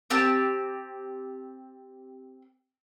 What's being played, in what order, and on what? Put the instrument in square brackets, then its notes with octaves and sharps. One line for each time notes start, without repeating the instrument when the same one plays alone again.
[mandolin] C4 G4 A5